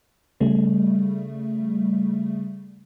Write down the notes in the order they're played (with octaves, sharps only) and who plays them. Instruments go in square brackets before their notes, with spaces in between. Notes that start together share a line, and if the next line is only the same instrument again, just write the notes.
[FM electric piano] C#3 G3 A3